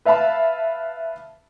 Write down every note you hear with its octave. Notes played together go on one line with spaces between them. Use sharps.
B4 E5 F5 A5 B5